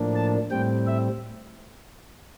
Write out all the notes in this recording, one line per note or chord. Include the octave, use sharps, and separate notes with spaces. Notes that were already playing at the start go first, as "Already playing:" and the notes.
Already playing: A2 F3 A#3 D4
A5
A2 G3 C4 G5
E5